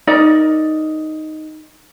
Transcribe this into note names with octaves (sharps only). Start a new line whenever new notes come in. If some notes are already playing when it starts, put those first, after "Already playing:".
D#4 A#4 D5